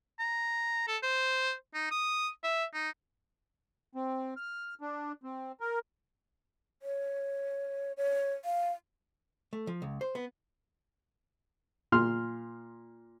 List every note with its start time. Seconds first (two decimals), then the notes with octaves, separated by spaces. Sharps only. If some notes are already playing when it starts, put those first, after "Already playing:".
0.19 A#5
0.88 A4
1.03 C5
1.74 D#4
1.91 D#6
2.44 E5
2.74 D#4
3.95 C4
4.37 F6
4.81 D4
5.23 C4
5.60 A#4
6.82 C#5
7.97 C#5
8.45 F5
9.53 A3
9.67 F3
9.82 C#2
10.01 C5
10.15 B3
11.92 A#2 C6 F6